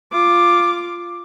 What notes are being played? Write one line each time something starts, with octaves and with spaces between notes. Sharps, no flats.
F4 D6